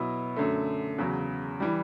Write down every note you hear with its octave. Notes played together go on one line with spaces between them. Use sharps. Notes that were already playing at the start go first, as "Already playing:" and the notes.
Already playing: B2 F#3 B3 E4
F#2 D3 A3
E2 C#3 F#3
E3 G3